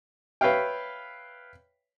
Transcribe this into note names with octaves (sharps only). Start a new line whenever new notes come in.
B4 C#5 E5 F5 G5